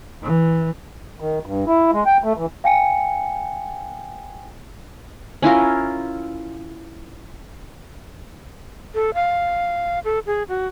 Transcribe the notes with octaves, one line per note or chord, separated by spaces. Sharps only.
E3
D#3
G2
E4
G#3
G5
A3
E3
F5 G5 G#5 C#7
C#4 E4 F4 A#4
A4
F5
A4
G#4
F#4